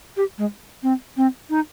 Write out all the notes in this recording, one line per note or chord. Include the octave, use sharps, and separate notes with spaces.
G4
G#3
C4
C4
D#4